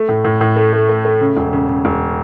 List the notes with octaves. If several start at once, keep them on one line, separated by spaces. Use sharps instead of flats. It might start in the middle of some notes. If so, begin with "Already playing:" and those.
Already playing: A3
A2
A2
A2
A3
A3
A3
A3
C#3
E1
C#3
C#3
E1